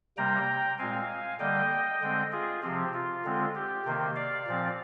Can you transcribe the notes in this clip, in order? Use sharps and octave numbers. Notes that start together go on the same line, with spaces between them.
C3 G3 A#3 G5 A#5
A#2 G#3 C4 F5 G#5
D3 G3 A#3 D#5 G5
D3 G#3 C4
F4 G#4
C3 F3 C4 G4
F4
D3 G#3 C4
G4
C3 D#3 A#3
D5 F5
A#2 F3 C4